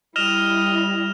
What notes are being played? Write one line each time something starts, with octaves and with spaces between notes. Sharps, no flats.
G3 E4 D#5 F6 E7 F7